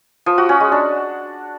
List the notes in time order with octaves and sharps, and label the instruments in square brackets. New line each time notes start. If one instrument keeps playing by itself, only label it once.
[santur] F3
F#4
C#4
G#3
D4